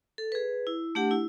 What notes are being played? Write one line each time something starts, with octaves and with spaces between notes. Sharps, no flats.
A4
G#4 B4
E4
A3 D4 G4 F#5
E4